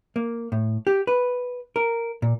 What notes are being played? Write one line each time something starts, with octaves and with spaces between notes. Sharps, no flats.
A#3
A2
G4
B4
A#4
A#2